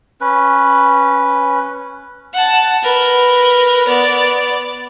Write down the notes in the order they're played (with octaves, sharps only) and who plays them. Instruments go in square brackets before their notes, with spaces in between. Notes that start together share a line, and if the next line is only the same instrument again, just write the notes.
[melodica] C#4 B4
[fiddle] F#5 A5
A#4 B4
B3 D5